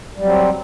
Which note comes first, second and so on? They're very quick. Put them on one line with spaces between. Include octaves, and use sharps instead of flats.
G3 F#3 C4